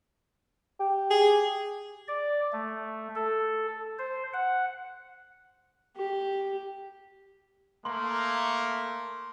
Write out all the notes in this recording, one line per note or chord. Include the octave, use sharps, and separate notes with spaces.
G4
G#4
D5
A3
A4
C5
F#5
G4
A3 A#3 C6